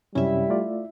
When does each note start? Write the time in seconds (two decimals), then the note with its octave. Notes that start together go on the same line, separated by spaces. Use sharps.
0.15 F#2 C3 G3 C#4 E4 E5
0.50 A3 F4 D5